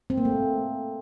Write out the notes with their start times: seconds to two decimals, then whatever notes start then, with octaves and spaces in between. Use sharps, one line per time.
0.10 C4
0.18 A#3
0.25 A3